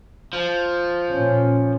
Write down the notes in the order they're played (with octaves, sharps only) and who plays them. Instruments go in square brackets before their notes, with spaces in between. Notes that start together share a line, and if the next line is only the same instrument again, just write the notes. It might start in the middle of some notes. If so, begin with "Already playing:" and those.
[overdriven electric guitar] F3
[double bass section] A#2 C#4